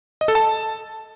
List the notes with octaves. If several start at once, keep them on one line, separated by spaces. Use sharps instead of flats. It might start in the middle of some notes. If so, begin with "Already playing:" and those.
D#5
A4
A5